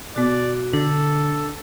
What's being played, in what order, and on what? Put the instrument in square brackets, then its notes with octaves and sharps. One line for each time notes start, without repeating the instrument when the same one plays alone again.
[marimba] B2 B3 [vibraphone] F#4 [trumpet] D5
[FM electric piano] D3 [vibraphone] D4 [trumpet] A4